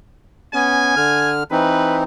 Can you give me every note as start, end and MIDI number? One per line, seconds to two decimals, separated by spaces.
0.54 0.95 59
0.54 0.95 61
0.54 1.32 80
0.96 1.43 50
0.96 1.43 89
1.51 2.04 52
1.51 2.04 60
1.51 2.04 63
1.51 1.94 71